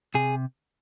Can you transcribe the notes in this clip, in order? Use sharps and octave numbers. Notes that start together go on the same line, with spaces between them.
C3 G#4